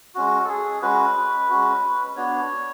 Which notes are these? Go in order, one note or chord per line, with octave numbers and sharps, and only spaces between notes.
G#3 C#4 F#4
A4
G#4
G#3 C#4 F#4 B4
G#3 C#4 F#4
B3 D4 F#4 C#5